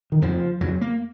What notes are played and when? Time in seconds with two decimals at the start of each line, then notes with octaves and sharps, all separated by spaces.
0.12 D#3
0.21 F2 C#3 F3
0.61 F2 C#3 F#3
0.81 A#3